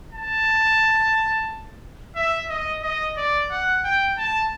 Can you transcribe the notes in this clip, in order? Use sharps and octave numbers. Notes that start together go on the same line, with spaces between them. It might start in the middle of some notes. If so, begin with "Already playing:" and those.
A5
E5
D#5
D#5
D5
F#5
G5
A5